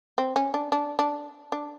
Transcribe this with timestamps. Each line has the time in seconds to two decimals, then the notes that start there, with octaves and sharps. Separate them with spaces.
0.18 C4
0.36 C#4
0.54 D4
0.72 D4
0.99 D4
1.52 D4